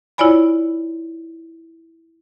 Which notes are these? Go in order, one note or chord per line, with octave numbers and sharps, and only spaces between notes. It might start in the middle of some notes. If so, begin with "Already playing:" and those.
E4 F4 C#5 D5 G#5 B5